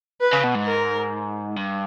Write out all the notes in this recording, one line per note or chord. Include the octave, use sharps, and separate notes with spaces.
B4
C#3
B2
G#2
A#4
G2